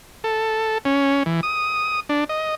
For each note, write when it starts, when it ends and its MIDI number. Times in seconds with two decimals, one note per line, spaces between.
0.24 0.78 69
0.85 1.23 61
1.26 1.41 52
1.43 2.00 87
2.09 2.24 62
2.29 2.55 75